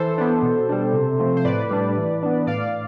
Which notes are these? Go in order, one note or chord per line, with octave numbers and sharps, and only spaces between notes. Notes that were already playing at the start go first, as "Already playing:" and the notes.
Already playing: E3 A4 C5
B3 D4
B2
G3 D4
C3
F3 A3 C4
C5
A2 B4 D5
G3 D4
E3
B3 D4
A2 D5 F5